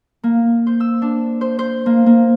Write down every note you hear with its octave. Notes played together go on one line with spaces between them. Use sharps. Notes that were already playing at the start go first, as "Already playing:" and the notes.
A#3
C5
E6
D4
C5
C5
A#3
A#3